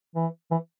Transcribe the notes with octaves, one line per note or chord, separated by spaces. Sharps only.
E3
E3